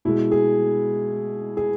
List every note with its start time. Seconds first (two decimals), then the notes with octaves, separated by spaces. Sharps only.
0.05 B2 G#3 E4
0.32 G#4
1.57 G#4